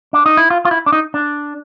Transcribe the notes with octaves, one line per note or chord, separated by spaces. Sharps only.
D4
D#4
E4
F4
F4
E4
D4
D#4
D4